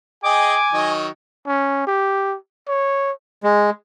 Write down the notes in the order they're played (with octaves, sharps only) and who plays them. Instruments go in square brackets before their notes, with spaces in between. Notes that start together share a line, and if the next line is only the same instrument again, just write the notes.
[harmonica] G#4 D#5 G5 [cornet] G#5 [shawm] D6
[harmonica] D#3 F#3 D#5
[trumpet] C#4
G4
C#5
[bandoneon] G#3